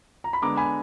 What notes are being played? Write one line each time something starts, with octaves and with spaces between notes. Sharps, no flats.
A#5
B5
D3 G#3 B3 A#5 D6
G#5 B5